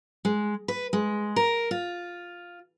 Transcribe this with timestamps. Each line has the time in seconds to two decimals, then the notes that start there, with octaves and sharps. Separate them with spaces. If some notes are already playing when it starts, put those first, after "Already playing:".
0.25 G#3
0.68 B4
0.93 G#3
1.36 A#4
1.71 F4